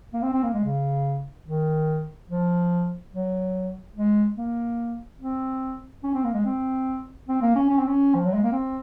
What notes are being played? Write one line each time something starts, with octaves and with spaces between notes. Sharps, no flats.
A#3
C4
C4
A#3
G#3
C#3
D#3
F3
F#3
G#3
A#3
C4
C#4
C4
A#3
G#3
C4
C4
A#3
C#4
C#4
C4
C#4
F3
F#3
G#3
A#3
C4